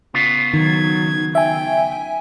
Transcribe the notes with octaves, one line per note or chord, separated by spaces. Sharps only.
C#3 B3 F4
D#3 F#3 G#6
E5 G5 G#5